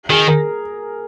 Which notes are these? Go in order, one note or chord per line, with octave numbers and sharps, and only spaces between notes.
D#3 G#4
A#4